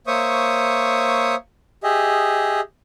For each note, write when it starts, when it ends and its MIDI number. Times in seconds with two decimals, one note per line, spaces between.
0.07 1.35 58
0.07 1.35 72
0.07 1.35 73
0.07 1.35 76
0.07 1.35 85
0.07 1.35 87
1.83 2.60 67
1.83 2.60 68
1.83 2.60 75
1.83 2.60 76